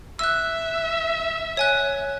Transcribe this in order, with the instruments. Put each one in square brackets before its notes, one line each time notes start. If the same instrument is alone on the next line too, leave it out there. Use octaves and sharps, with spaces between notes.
[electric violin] E5 [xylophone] E6 F#6
[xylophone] C#5 G#5 F#6